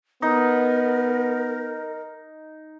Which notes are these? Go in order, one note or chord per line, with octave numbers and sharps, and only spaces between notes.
B3 D#4 A#4